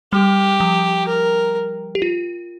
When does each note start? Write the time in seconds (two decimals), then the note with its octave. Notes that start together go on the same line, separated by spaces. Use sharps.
0.13 G3 G4
0.60 F3
1.07 A#4
1.95 G4
2.02 F4